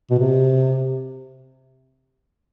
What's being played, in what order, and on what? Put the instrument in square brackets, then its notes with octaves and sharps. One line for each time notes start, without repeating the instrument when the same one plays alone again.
[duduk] B2
C3